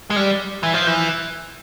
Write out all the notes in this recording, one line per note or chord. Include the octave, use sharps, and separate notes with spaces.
G#3
G3
E3
F3
E3